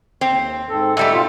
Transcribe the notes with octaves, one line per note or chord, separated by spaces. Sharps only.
D#2 C4
G#2 C4 A4
G#2 G3 A3 E5 E6
B2 C4 F4